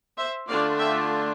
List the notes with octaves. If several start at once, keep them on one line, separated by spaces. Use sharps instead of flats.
C5 E5
D3 A3 D4 F4 D5 F5
E5 G5